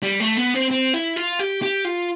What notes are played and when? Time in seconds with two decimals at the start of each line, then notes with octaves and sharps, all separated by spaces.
0.03 G3
0.20 A3
0.37 B3
0.54 C4
0.71 C4
0.93 E4
1.16 F4
1.39 G4
1.62 G4
1.85 F4